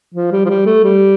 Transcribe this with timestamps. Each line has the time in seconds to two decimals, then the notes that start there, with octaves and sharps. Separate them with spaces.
0.15 F3
0.32 G3
0.45 F3
0.50 G3
0.66 A3
0.84 G3